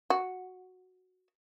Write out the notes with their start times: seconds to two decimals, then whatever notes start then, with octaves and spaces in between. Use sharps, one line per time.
0.10 F#4